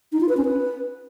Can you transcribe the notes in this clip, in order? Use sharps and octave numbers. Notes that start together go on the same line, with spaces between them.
D#4
F4
B4
C#4
B4